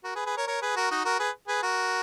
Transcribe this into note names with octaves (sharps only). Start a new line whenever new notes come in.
F#4 A#4
G#4 B4
G#4 B4
A#4 C#5
A#4 C#5
G#4 B4
F#4 A#4
D#4 F#4
F#4 A#4
G#4 B4
G#4 B4
F#4 A#4